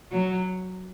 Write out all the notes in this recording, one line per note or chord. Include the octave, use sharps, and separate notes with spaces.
F#3